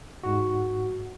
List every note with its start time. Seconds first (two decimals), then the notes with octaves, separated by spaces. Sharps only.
0.23 G#2 F#4